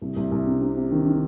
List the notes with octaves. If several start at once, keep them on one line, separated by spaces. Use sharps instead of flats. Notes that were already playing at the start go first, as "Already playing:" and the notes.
C2
C2
C2
C3
C3
C3
D#3
D#3